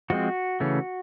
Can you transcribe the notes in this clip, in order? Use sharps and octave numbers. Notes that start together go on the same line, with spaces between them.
F3 G#3 C4 F#4
C#3 E3 A3 C#4